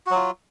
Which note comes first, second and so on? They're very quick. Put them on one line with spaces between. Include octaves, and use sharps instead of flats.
F#4 F#3 F4